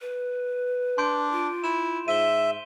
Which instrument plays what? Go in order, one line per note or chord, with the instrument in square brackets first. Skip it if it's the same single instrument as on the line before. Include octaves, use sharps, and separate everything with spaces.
[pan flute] B4
[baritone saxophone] D4 [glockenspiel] C6 G6 D7
[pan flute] F4
[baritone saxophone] E4 [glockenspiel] E7
[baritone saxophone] G#2 [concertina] E5 [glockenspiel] D#7 G7